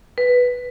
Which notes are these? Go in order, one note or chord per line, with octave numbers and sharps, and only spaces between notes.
B4